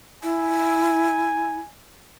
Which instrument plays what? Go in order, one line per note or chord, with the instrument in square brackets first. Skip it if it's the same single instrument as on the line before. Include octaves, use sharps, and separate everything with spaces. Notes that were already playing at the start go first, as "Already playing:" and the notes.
[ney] E4 [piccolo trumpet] G#5